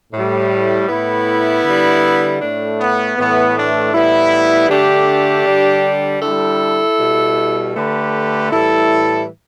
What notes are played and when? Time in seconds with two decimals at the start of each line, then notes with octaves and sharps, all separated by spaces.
0.13 A2 G3
0.89 A2 A3 B3 E4
1.65 D3 G3
2.41 A2 A3 D4
2.79 B3
3.17 A2 E3 A3 B3
3.56 D4
3.93 A2 G3 B3 E4
4.69 D3 A3 D4 G4
5.47 D3 G3
6.22 D3 G3 E4 A4
6.98 B2 G3
7.75 D3 A3 G4 B4
8.51 A2 E3 G3 E4 A4